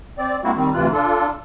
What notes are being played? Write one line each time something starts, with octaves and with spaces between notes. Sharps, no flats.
C4 D5
G#3 A#3 C4 E4 F#4
D#3 G3 C4
D2 C3 E3 F4 F#6
D4 F4 A4